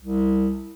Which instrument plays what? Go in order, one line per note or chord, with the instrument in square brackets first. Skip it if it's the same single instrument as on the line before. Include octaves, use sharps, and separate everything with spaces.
[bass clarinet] C2